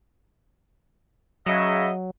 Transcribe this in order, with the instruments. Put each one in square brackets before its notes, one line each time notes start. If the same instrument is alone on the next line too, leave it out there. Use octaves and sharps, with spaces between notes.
[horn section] C#3 D#5 E5 [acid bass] F#3